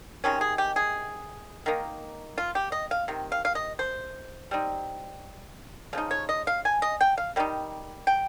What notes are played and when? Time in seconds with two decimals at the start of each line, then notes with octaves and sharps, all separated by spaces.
0.24 C3 D#3 G#3 C#4
0.41 G#4
0.58 G4
0.76 G#4
1.66 D#3 A#3 D#4
2.38 F4
2.55 G4
2.72 D#5
2.91 F5
3.08 C3 D#3
3.32 F5
3.45 F5
3.55 D#5
3.79 C5
4.51 G3 C4 D#4
5.93 C#3 F3 D#4
6.11 C#5
6.29 D#5
6.47 F5
6.65 G#5
6.82 D#5
7.01 G5
7.18 F5
7.36 D#3 G3 D#4
8.07 G5